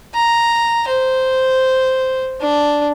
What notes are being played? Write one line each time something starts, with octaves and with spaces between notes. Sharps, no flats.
A#5
C5
D4